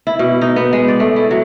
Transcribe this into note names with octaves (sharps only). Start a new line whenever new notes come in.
E4
B2
D#4
B3
G#3
D5
A3
E4
F#3